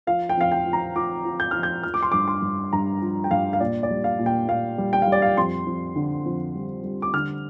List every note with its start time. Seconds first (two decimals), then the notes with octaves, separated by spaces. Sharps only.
0.07 F3 F5
0.29 G5
0.37 F2 F5
0.52 G5
0.66 F3
0.73 A#5
0.95 F3 D6
1.25 F3
1.40 G6
1.51 F3 F6
1.63 G6
1.83 F3 F6
1.94 D6
2.03 C6
2.12 G2 D6
2.28 C6
2.42 G2
2.73 G2 A#5
3.02 F3
3.24 G5
3.31 G2 F5
3.53 F5
3.60 A#2 D5
3.83 D5
3.91 G3
4.04 F5
4.19 A#2
4.26 G5
4.48 A#2 F5
4.78 G3
4.93 G5
5.02 F5
5.07 G3 D5
5.22 F5
5.37 F2 C6
5.67 F2
5.96 D3
6.25 F2
6.55 G3
6.84 G3
7.02 D6
7.14 D3 F6